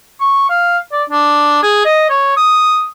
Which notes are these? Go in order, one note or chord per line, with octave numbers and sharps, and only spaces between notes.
C#6
F5
D5
D4
G#4
D#5
C#5
D#6